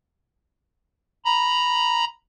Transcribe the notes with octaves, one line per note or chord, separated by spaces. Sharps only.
A#5 B5